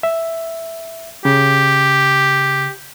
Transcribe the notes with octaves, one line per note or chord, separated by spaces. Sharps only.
E5
C#3 G4